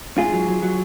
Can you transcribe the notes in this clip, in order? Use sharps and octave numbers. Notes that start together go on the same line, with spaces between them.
G#2 F4 G#4
F#3
F#3
F#3